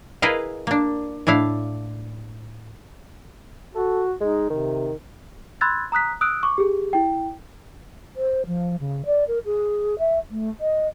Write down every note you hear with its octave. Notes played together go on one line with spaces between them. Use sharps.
E4 G#4 A#4 B4 D#5 F5
A#3 D4
A2 D4 E4 F5
F#4 A4
G#3 D#4
C3 D#3
B5 C6 E6 F#6 G#6 A6
A#5 D#6 F#6 B6
D#6 E6 F#6 D7
C#6 D6
G4 G#4
E4 G5
C5
F3
C#3
D5
A#4
G#4
E5
A3
D#5